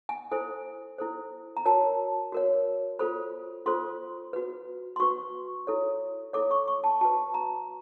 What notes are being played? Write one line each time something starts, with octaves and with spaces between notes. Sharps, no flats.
G#5
E4 A4 C5 G#5
E4 A4 C5
A#5
F#4 A#4 C#5 A5
F#4 A#4 C#5
F4 A4 C5 B5
F4 A4 C5 C6
F#4 B4
C6
F#4 B4 C#6
E4 A4 C#5
E4 A4 C#5 D6
C#6
C#6
A5
F#4 B4 A5
A#5